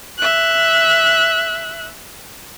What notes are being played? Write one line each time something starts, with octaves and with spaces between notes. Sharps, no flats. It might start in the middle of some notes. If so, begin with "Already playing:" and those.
E5 F#6